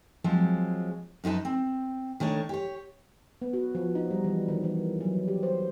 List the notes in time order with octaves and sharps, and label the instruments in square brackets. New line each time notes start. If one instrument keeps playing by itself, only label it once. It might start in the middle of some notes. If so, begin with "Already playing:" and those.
[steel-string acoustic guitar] F3 F#3 G#3 C4
F#2 D#4 G#4 B4 A5
C4
D#3 A3 D4 C#5
G4 C#5
[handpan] B3
F#4
F3
D#4
G3
E3
D#3
E3
F#3
G4
C5